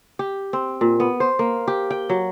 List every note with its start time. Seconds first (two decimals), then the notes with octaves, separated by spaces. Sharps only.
0.19 G4
0.53 C4
0.81 A#2
1.00 B3
1.20 C5
1.39 A#3
1.68 G4
1.91 G5
2.10 F#3